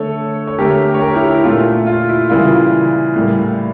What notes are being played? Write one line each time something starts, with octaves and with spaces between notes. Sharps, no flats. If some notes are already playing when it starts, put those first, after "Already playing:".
Already playing: D3 A3 A4 C#5
C#5
D3 A3 G4 A#4
C#5
G4 A#4
E4 G4
E4
A#2 A3 F4
F4
E4
C#3 E3 G3 A#3 F4
A2 G3 A#3